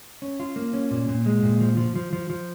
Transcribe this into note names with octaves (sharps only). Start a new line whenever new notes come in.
C#4
F4
A#3
C#4
A#2
A#2
G#3
A#2
F3
F3
F3
F3
F3